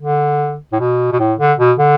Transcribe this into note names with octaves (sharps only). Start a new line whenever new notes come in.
D3
A2
B2
B2
A2
D3
B2
D3